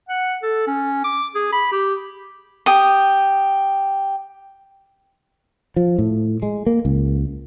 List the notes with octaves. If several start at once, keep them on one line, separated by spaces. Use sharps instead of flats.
F#5
A4
C#4
D6
G#4
B5
G4
G4 D#6
F3
A2
G#3
A#3
C#2